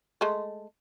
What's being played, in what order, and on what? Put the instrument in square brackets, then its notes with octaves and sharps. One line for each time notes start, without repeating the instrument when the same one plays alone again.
[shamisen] G#3 A3